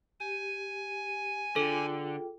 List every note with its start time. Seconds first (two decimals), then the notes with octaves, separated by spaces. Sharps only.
0.20 G4 G#5
1.56 D3 F4 G#4 A4 G5